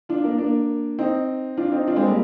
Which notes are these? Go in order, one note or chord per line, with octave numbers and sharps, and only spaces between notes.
D4 F4
A#3 D4
A#3 D4
C4 D#4
D4 F4
C4 D#4
D4 F4
G#3 C4
G3 A#3